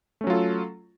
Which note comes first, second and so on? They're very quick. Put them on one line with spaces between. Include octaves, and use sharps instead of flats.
A3 C#4 F#3 F4 A4